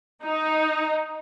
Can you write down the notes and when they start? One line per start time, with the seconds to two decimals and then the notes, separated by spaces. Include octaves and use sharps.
0.23 D#4